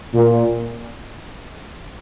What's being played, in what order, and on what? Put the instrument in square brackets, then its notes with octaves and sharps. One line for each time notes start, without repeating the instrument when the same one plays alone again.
[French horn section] A#2